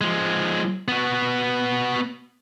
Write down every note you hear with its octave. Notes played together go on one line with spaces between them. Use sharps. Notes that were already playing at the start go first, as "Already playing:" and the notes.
F3 G#3
B3 F#4